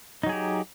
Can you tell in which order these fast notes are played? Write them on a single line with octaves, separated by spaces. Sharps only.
D#4 F#3 G#4 G4